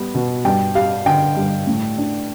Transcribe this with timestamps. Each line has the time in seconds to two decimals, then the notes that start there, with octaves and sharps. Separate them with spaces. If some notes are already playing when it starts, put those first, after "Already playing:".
Already playing: G3 B3
0.15 B2
0.45 G2 G5
0.75 G3 F5
1.06 D3 G5
1.37 G2
1.67 A2
1.97 D4